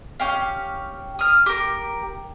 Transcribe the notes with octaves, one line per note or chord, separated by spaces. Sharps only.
C#4 G4 F5
D#6 F6
G4 A#4